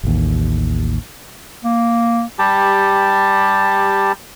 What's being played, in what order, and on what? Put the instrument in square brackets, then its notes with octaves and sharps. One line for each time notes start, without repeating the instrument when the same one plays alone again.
[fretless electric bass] A1 D#2
[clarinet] A#3
[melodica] G3 G4 A5